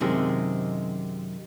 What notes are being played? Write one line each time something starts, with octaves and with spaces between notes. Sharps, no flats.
F#2 C3 D#3 G#3